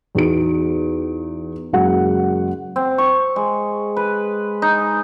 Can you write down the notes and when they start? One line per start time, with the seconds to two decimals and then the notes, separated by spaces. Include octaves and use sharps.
0.15 E2 D#4 F#4 D7
1.73 F#1 G#3 F#4 F#5
2.76 C4
2.98 C#6
3.36 G#3
3.97 B4
4.62 D#4